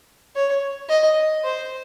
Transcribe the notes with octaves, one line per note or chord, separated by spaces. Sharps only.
C#5
D#5
C5